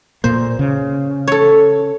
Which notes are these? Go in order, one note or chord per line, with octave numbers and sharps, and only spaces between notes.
A#2 A#3 C5
C#3
A4 C#5